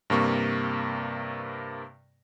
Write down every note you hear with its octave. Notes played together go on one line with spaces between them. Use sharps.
G2 C3 A#3 C#6